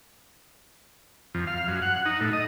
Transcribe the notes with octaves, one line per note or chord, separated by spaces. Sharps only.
F2
F5
F#2
F#5
D#4
A2
D#5